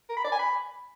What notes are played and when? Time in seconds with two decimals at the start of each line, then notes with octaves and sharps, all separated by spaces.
0.09 A#4
0.17 B5
0.24 D5
0.32 G#5
0.39 B5